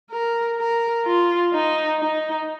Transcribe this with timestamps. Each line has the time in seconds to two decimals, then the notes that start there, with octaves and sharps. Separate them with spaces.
0.11 A#4
0.59 A#4
1.06 F4
1.54 D#4
2.00 D#4